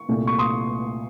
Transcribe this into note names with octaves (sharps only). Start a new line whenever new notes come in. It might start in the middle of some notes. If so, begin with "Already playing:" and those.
Already playing: C#6
C2 A#2 A3
C#6
C6 D#6